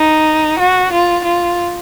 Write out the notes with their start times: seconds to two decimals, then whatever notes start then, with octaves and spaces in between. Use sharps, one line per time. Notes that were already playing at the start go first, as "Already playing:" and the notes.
Already playing: D#4
0.59 F#4
0.93 F4
1.25 F4